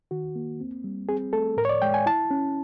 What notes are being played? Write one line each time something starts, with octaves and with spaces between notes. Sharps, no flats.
D#3 F#4
A#3
C4
G3
C4 G#4
A3 A4
A2 A#4
C#5
D5
G#3 G5
G#5
E4 A5
C#4